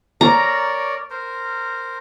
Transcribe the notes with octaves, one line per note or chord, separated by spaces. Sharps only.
A#4 C#5 D5 A#5
A#4 C5